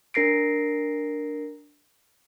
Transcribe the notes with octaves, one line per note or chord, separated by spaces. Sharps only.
D4 A#4 A#6 C7 D7